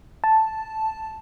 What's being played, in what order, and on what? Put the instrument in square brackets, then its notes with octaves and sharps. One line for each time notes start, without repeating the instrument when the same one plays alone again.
[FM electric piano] A5